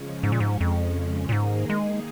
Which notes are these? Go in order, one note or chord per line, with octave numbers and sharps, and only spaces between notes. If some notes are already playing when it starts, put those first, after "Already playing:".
Already playing: C#3 F3 G#3 C#4
G#2
A#2
G#2
F2
A#2
G#2 D#3 A#3 D#4 G#4
G#3